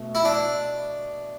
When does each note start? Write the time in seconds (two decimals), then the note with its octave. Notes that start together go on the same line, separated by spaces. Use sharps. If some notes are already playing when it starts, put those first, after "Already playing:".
Already playing: B2 A3
0.15 E4
0.25 D4